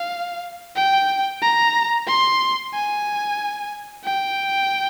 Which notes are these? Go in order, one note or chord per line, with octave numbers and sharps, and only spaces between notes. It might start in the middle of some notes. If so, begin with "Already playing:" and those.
Already playing: F5
G5
A#5
C6
G#5
G5